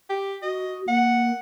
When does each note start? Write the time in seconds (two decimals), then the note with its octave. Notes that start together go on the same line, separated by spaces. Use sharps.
0.10 G4
0.42 F#4 D#5
0.88 A#3 F#5